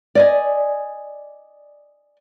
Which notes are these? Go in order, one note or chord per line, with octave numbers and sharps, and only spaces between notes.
D5 D#5 G#5